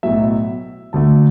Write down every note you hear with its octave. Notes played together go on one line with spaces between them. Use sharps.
B1 A2 F#3 E5
D2 D3 A3 A5